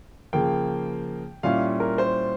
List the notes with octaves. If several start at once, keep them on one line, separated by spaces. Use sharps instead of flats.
C#3 F3 A#3 G5
A#2 G3 C#4 E4 F5
A#4
C5